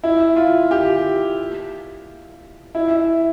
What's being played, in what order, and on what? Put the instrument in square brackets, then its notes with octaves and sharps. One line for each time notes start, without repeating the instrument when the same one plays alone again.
[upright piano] E4
F4
G4
E4
E4